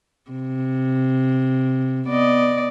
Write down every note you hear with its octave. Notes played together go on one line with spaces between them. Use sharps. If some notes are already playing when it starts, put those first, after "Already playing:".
C3
B3 D5 D#5